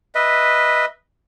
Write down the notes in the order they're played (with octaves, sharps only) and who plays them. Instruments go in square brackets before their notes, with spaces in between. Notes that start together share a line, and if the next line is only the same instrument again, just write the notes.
[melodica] B4 D#5 E5